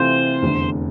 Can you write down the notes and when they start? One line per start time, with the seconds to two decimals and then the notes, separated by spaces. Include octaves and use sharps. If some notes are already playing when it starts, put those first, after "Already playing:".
Already playing: C3 E3 A3 C4 F4 C5
0.42 F1 E2 D3